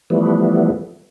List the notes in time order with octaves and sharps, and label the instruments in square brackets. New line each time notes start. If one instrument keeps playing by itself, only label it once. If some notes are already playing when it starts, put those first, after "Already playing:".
[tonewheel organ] E3 F3 G3 A3 B3